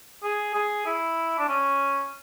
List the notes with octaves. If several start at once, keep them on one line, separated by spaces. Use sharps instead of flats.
G#4
G#4
E4
D4
C#4